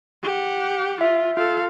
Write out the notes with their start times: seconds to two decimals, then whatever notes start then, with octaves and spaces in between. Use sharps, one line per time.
0.23 G4 F#5
1.01 F4 E5
1.37 F4 A4 F5